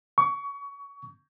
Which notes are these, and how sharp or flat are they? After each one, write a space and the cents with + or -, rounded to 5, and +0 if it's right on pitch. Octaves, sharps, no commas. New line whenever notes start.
C#6 +25